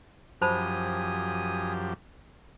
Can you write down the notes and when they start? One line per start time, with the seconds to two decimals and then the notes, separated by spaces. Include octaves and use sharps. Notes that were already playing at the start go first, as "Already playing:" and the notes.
0.42 F#2 F3 G4 C5 G#5 A5 B5 D#6